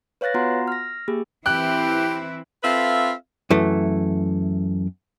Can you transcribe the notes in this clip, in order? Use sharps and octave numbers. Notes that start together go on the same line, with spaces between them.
B4 C#5 F5 F#6 A6 A#6
B3 F4 F#4 F#5 A#5 C6
F6 A#6
A#3 G4 G#4
E3 C4 E4 G4 F#6
C4 F4 A4 B4 E5 F5
F#2 E3 A3